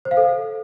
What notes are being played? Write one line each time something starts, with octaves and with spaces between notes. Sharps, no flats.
C5
F5
A4